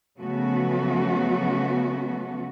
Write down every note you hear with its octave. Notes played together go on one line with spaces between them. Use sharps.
C#3 F3 F#3 A3 B3 F#4